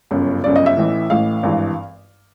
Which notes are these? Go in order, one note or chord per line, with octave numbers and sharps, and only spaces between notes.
G1 F#2 C#3
G1 F#2 C#3 D5
D#5
E5
A1 A2 E3
A1 A2 E3 F5
G#1 G2 E3